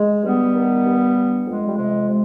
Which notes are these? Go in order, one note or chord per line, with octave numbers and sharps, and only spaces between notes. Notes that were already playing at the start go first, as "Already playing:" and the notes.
Already playing: G#3
G2 G3 B3
D#3
G2
G2
F2 G#3
G3
C3 G#3
C3 G#3